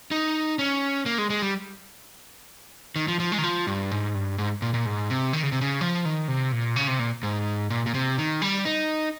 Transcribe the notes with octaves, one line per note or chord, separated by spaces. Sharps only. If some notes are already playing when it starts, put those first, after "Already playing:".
D#4
C#4
A#3
G#3
G#3
G3
D#3
F3
F3
G#3
D#3
F3
G2
G#2
G2
G#2
A#2
A#2
G#2
C3
D#3
C#3
C3
C#3
F3
D#3
C3
A#2
C#3
C3
A#2
G#2
A#2
A#2
C3
D#3
G3
D#4